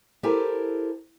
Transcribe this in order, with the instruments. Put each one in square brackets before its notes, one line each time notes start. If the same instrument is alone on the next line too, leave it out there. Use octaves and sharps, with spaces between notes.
[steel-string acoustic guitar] E4 G4 A4 A#4 C5 G#5